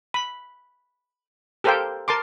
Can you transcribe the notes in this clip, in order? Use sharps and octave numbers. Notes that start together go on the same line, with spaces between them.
B5
G4 A4 A#4 C5 F5 G5
A#4 A5 C6 D6